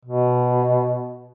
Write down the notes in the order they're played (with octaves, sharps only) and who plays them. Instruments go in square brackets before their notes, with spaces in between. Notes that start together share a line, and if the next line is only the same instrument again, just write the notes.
[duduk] B2